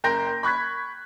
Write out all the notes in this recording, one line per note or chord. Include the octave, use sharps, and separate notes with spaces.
F#1 A#4 G5 C6 G6 A#6
B5 C#6 F#6 G#6 B6